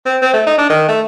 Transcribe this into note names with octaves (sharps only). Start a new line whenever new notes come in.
C4
C4
A3
D#4
D4
D#3
A3